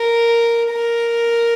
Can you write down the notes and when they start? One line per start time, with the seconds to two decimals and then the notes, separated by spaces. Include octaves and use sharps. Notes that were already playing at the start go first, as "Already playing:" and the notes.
Already playing: A#4
0.71 A#4